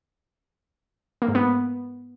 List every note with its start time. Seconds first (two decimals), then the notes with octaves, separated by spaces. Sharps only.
1.22 A#3
1.28 G#2
1.35 B3